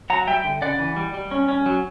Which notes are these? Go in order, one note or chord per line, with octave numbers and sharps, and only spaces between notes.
F#3 F#5 A#5
G3 E5 G5
D3
C#3 D5 F#5
E3
G3
G3
C#4
C#4
F#3